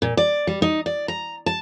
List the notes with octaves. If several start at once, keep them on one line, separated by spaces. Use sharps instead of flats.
A#2
D5
G3
D#4
D5
A#5
A5